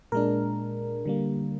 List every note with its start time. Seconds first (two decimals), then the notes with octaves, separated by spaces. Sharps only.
0.12 A#2 G#3 D4 A#4
1.05 D3 G3 A#3